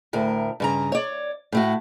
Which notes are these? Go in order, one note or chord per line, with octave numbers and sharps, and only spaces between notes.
D2 A2 A#4
G2 C#3 A#5
C#5 D5
A2 A3 F#4